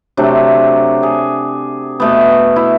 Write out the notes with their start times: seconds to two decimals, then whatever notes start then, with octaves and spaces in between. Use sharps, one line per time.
0.17 C3 F#3 A3 D4
1.03 G#4
2.00 B2 A3 B3
2.56 E4